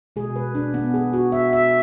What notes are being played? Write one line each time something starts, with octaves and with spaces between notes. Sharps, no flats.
B2 G#3 G#4
B4
D4
B3
G#4
F#4
E5
E5